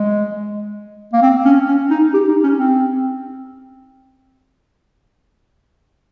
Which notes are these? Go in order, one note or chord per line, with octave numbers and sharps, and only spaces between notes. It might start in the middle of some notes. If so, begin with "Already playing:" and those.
Already playing: G#3
A#3
C4
C#4
C#4
D#4
G4
D#4
C#4
C4